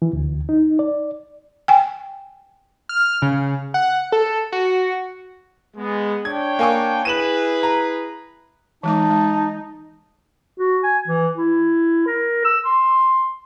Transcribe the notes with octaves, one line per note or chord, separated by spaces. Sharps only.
E3
D2
D#4
D5
G5 G#5
F6
C#3
F#5
A4
F#4
G#3 B3
D4 C#5 G5 G#6
A#3 G#5 C#6
E4 G#4 B4 D#7 E7 F#7
A#5
E3 G#3 D#4 A5 D6
G#3
F#4
G#5
E3
E4
A#4
E6
C6